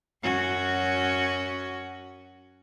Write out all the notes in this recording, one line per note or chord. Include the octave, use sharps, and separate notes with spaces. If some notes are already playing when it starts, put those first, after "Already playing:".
F#2 C#4 F#4